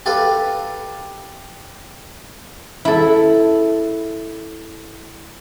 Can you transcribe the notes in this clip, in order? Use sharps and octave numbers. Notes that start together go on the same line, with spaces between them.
G4 A4 B4 F5
E4 A4